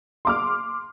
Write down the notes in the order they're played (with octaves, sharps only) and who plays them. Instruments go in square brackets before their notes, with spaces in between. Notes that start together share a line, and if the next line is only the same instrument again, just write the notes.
[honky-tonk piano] C6 D6 F6